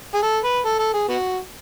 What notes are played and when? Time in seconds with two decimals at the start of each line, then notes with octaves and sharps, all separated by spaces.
0.14 G#4
0.23 A4
0.44 B4
0.66 A4
0.80 A4
0.94 G#4
1.08 B3 F#4